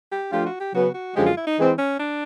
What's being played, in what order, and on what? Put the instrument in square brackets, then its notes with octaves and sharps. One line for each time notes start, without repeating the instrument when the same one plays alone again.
[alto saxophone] G4
[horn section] F3 A3 D4 F4 [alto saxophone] G4
[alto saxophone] F#4
G4
[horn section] C#3 F#3 B3 [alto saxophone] F#4
[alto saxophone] F#4
[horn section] F#2 D3 F3 G#3 [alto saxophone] G4
[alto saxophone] F4
E4
D#4
[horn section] E3 G#3 C4
[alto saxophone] C#4
D4